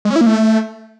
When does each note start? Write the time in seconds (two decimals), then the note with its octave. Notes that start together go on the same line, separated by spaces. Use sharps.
0.05 G#3
0.10 C#4
0.16 E4
0.21 A#3
0.26 A3